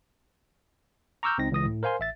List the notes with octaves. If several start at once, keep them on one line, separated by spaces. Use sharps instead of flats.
A#5 C#6 D6 E6 F6 G6
C#2 C4 D#4 A#6
C#2 E3 D#6 A#6
A2
A#4 C5 F5 G#5 C6
A1 E5 A6